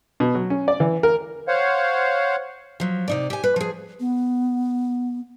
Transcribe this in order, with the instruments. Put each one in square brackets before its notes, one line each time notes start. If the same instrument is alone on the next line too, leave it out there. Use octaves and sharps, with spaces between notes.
[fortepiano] B2
F#3
C#4
D5
E3
A#4
[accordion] C5 C#5 F5 F#5
[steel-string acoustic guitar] F3 F#3
C3 D#4 D5
G4 G#5
B4
F3 G#4
[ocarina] B3